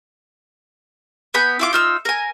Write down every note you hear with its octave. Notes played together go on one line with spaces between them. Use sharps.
B3 G#5 B5 G6
E4 F4 D6
D#4 F4 E6
A#4 G#5